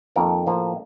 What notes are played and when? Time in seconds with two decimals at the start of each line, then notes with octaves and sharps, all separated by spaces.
0.16 F2 D#3 A#3 A#4
0.46 A2 F3 A#3